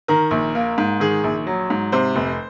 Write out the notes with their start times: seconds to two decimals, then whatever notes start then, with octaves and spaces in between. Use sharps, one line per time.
0.08 D#3 A#4
0.31 A#1
0.55 A#3
0.78 G#2
1.00 D#3 G#4
1.24 A#1
1.47 F#3
1.70 G#2
1.92 C3 C5
2.16 F1